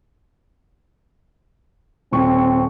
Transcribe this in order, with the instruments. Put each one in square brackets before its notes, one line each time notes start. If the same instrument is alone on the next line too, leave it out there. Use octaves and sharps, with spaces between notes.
[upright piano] D#1 C#6 [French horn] C4